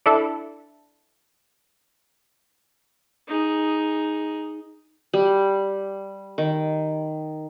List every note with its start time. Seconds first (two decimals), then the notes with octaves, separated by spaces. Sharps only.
0.06 D4 E4 A4
3.28 D#4 G#4
5.14 G3
6.38 D#3